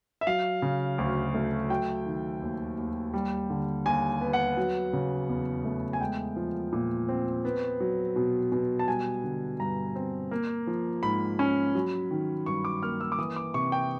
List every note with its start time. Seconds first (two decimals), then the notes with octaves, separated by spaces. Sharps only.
0.21 E5
0.27 F#3 F5
0.62 C#3
0.98 D2
1.34 A3
1.70 F#3 G5
2.06 D#3
2.42 D#2
2.78 D#2
3.13 G3
3.50 D3
3.85 D#2 G#5
4.21 B3
4.33 F#5
4.57 F#3
4.93 C#3
5.29 E2
5.65 A3
5.93 G#5
6.01 G#3 G5
6.36 F3
6.72 A#2
7.09 C4
7.45 B3
7.80 F#3
8.16 B2
8.52 B2
8.79 A5
8.88 G3 G#5
9.24 D3
9.60 G2 A#5
9.95 C4
10.31 A#3
10.67 F3
11.03 G#2 B5
11.39 C#4
11.75 F#3
12.11 D#3
12.46 G2 C#6
12.65 D6
12.82 A#3 F6
13.01 E6
13.12 D6
13.18 E3 D#6
13.36 D6
13.54 C3 C#6
13.72 G5